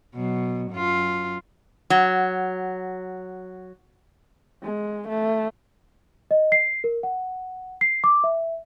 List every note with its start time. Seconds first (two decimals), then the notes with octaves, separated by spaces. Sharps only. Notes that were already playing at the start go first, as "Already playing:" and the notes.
0.15 B2 F#3
0.72 F#2 F4
1.90 F#3 F#5
4.64 G#3
5.09 A3
6.31 D#5
6.52 C7
6.84 A#4
7.03 F#5
7.81 C7
8.04 D6
8.24 E5